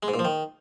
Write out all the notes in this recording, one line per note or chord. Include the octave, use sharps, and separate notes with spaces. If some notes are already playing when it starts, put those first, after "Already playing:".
G#3
G#2
A#2
F3
D#3